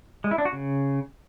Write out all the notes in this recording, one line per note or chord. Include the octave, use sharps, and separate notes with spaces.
G#3
E4
D4
F#4
C#3